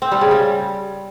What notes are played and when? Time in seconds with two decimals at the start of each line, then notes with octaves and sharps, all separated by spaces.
0.02 C4
0.12 G3
0.21 C#3
0.31 G3